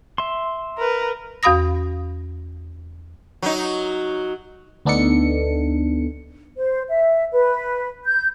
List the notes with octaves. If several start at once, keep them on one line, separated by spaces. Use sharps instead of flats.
E5 C6
A#4 B4
E2 F#4 F5 B5 D#6 A#6
F#3 D#4
D2 B3 D4 D#4 A4 C#7
C5
E5
B4
G6